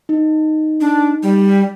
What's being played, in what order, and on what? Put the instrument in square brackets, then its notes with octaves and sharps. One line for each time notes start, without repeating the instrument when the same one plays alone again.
[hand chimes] D#4
[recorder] D4
G3